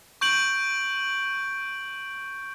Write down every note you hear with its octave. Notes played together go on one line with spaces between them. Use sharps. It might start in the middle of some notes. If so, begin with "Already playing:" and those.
C#6 G6 D7 F#7